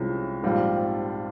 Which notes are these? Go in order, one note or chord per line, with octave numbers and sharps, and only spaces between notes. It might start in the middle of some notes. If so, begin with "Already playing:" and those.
Already playing: C2 C3 F3 G#3 C#4
A#1 G#2 G3 C4 F4